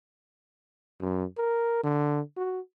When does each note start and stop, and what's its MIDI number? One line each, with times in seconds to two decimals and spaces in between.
1.01 1.25 42
1.38 1.80 70
1.84 2.21 50
2.37 2.60 66